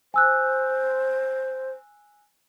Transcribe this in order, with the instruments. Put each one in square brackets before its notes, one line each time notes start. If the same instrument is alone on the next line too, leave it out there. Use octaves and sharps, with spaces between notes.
[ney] C5 [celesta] G#5 E6 F#6